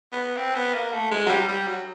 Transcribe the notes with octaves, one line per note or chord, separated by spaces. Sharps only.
B3
C4
B3
A#3
A3
G#3
F#3
G3
G3
F#3